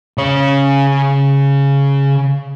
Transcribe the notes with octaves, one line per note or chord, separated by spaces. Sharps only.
C#3 C#5